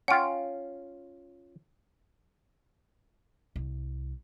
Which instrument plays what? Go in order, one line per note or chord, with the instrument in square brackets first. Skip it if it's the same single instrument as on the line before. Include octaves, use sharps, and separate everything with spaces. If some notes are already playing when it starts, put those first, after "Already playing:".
[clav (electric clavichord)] C#4 F4 [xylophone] F#5 G5
[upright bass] C2